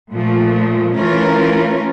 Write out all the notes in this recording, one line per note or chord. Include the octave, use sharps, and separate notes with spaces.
A#2 F3 A3
E3 A3 C#4 F4 A#4